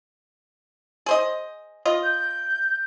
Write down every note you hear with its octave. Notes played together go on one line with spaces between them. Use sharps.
G#4 C5 D#5
F4 D#5
G6